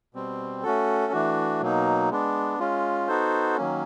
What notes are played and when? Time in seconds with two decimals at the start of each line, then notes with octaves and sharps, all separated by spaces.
0.14 B2 G3 C4
0.63 A3 C#4 F#4 A4
1.12 E3 A3 D4 F#4
1.61 B2 F#3 A#3 D#4
2.11 G#3 B3 D4
2.59 G#3 C#4 F4
3.08 B3 D#4 F#4 A4 C5
3.57 D#3 F#3 A#3 C#4